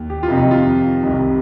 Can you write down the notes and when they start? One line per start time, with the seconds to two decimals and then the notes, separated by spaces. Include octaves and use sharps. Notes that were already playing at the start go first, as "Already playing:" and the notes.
Already playing: D#2
0.10 G4
0.23 F4
0.28 F2 C3 D#3
0.37 D#4
0.51 F4
1.03 C2 C3 D#3